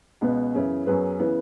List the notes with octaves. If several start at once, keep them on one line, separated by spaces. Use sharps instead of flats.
C#2 B2 B3
F#2 C#3 E3 B3 E4
F#2 F#3 B3 G#4 B4
C#3 E3 B3